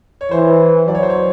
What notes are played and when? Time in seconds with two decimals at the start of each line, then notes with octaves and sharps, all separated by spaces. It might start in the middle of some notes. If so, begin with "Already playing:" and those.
0.21 C#5
0.31 E3 C5
0.88 F#3 D5
0.95 C#5
1.03 C5
1.10 C#5